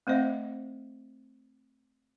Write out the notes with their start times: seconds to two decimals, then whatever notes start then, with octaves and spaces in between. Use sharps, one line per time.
0.07 A3 C4 C5 D#5 E5